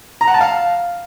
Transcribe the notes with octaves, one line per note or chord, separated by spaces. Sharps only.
A#5
F#5
A5
F5